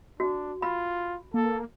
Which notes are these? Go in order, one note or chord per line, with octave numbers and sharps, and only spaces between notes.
D4 F#4
F4 B5
A#3 A4